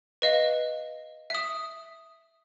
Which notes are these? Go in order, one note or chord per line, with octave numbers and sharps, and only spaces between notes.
B4 D#5 F5
E5 D#6